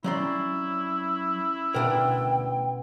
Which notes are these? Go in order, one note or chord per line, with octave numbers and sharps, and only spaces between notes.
F#3 C#4 E4 D5 C6
D2 B2 D4 A#4 G5